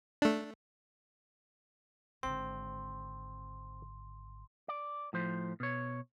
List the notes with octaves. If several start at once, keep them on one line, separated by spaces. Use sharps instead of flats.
A3 D4
G#1 D3 C4 C6
D5
A2 F3 C5
B2 C#5